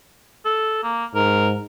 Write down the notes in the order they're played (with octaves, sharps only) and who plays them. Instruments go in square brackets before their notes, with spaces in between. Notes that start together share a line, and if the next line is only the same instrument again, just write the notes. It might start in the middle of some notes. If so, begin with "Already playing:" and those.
[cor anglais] A4
A#3
[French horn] G#2 [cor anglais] A#4